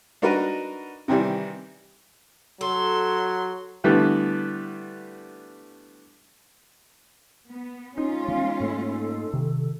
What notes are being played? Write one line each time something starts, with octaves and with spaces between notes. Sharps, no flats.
D4 D#4 F#4 A#4 B4
C3 D#3 E3 G3
F#3 A4 C6
D3 E3 G3 A3 B3
B3
G#3 C#4 D#4 F4
E3 B3 F5
G#2 A3 A#3 A4
C3 D#3